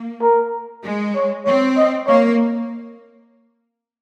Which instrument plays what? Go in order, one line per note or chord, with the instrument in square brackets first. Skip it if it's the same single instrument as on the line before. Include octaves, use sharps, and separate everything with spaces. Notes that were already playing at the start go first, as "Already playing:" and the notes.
Already playing: [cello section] A#3
[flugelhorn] A#4
[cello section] G#3
[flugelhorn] C#5
[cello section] C4 [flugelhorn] C#5
[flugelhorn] D#5
[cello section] A#3 [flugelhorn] C#5